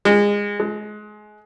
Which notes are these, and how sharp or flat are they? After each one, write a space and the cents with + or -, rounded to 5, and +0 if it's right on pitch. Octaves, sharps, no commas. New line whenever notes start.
G#3 -25
G#3 +25